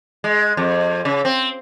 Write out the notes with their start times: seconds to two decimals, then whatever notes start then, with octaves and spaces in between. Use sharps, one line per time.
0.24 G#3
0.57 F2
1.05 C#3
1.25 C4